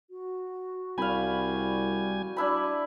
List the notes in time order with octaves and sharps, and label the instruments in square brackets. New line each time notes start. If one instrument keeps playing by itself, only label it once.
[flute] F#4
[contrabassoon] C2 [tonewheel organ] G3 G#5 [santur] F5 B5
[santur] D4 E4 B5